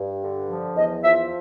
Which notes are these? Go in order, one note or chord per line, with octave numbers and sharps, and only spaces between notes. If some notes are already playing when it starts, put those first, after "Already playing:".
Already playing: G2
D3
F3
E2 D#5
F3 E5